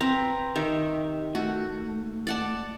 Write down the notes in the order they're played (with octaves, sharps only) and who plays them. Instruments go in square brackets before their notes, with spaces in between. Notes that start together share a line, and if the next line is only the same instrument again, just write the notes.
[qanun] C4 [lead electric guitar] B4 A#5
[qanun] D#3 [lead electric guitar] G4 E5
[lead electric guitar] A3 [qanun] F#4
[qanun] D5 F#5 A5